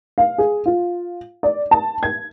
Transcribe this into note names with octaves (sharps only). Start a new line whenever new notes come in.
F5
G#4
F4
D5
A5
G#6